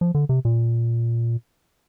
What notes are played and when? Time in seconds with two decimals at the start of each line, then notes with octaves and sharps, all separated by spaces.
0.01 F3
0.15 D3
0.29 C3
0.45 A#2